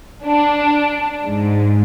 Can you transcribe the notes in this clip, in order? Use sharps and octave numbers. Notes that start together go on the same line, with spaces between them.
D4
G#2